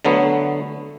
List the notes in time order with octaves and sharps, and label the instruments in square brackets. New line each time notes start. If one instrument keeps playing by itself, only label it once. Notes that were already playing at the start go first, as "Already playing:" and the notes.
[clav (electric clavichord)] D3 F#3 A3 B3